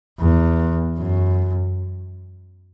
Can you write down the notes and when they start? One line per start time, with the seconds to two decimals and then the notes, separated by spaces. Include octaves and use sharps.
0.19 E2
0.98 F#2